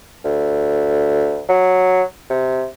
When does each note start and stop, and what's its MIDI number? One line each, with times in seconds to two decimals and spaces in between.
0.25 1.41 38
1.49 2.03 54
2.30 2.66 48